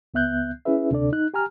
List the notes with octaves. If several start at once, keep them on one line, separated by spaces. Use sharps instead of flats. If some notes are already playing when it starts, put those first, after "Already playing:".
C#2 B3 E5 F#6 G6
C#4 E4 G#4 B4 E5
D2 C3 D4 A4 D5
D#4 F#6
G4 G#5 A#5 F6